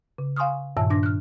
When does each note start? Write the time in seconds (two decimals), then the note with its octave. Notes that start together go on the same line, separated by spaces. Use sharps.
0.18 C#3
0.37 F5 G#5 C6 C#6 D#6 F6
0.77 G2 A#2 D#3 E5 A5 E6
0.90 D4 D6 A#6
1.03 F6 F#6